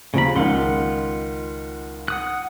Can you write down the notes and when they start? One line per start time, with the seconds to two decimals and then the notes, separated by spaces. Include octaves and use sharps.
0.14 D#2 C#3 F3 A#5 B5
0.36 C#2 D#3 F4 F#5 C6
2.08 F#5 D#6 F#6